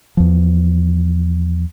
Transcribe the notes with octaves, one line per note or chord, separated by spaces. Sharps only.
E2 F3